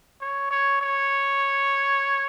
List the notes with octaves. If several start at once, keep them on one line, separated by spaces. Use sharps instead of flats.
C#5
C#5
C#5